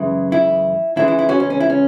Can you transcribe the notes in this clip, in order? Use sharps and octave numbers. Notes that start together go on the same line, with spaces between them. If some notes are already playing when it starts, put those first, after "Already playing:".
Already playing: F#2 C#3 E3 G#3 E4
E4
C#2 C#3 E3 G#3 E4
E4
E4
C#4 F#4
C#4
C#4
E4
C#4